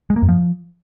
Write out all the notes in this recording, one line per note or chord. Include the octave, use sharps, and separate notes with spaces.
G#3
A#3
F#2
F3